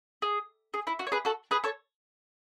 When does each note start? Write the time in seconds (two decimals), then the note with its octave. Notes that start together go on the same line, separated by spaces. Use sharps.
0.22 G#4
0.74 G#4
0.87 E4
0.99 F#4
1.07 C#5
1.12 G#4 B4
1.25 F#4 A4
1.51 G#4 B4
1.64 A4 C#5